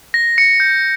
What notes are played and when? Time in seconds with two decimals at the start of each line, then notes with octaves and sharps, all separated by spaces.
0.14 A#6
0.38 C#7
0.60 G6